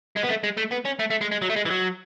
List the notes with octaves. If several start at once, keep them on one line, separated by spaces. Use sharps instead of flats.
G#3
B3
A3
G#3
A3
B3
C#4
A3
A3
G#3
G#3
F#3
A3
G#3
E3
F#3